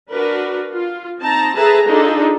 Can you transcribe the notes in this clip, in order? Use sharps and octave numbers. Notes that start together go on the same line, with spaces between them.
D4 F#4 A#4 B4
F4
C4 D#4 A5 A#5
G#4 A4 B4 E5 A5 A#5
D4 D#4 F4 G#4 A4